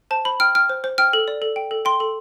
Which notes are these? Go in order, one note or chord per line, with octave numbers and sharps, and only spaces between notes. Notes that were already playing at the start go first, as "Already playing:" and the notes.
C5 A5
C5 B5
G5 F6
G5 F6
C5
C5
G5 F6
A4
D5
A4
G5
A4
G5 C6
A4